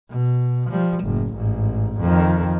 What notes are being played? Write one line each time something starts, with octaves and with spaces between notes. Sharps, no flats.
B2
F3 G3
F#1 A2
A1 G#2
F2 D#3